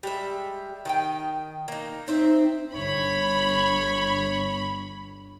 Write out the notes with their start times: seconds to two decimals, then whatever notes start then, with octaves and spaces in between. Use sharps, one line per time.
0.03 G3 G#3 E5
0.85 D#3 D#5 G5
1.68 A#3 D#4
2.08 C4 D#4 C5 E5
2.75 G1 C#5 B5